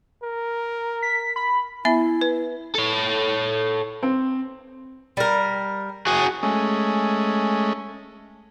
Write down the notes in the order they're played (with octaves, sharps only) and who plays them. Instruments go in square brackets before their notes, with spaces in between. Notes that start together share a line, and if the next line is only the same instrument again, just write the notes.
[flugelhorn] A#4
[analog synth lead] B6
B5
[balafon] B3 E5 B5 [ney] E4
[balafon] B4
[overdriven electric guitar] A4 C#5
[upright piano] C4
[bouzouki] G3 A#4
[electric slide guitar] F#4 G#4
[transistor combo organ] G#3 A3 C#4